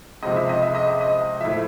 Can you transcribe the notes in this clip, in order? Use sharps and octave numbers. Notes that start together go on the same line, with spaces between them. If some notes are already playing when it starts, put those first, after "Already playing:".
C#2 C3 F3 D#5
E5
D#5
E5
D#5
E5
D#5
A2 F3 E5